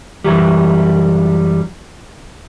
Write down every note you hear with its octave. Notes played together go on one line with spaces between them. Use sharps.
F#2 E3 F#3 G3